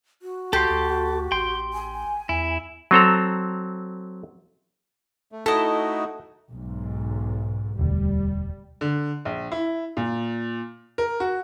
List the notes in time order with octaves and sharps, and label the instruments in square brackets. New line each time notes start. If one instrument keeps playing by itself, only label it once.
[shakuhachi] F#4
[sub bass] C#2 [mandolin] G4 [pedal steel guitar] A4 C6
[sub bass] D2
[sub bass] A1 [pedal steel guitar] G5 C6
[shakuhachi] G#5
[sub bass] E2 [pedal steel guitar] E4
[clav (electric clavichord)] F#3 C4 A4 A#5
[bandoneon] A3
[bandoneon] A3 D#4 F#4 [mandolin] E4 D#5 [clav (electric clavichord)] A4
[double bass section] B1 G#2
[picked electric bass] E1 D2 [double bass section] G3
[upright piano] D3
A#1
E4
A#2
A#4
F#4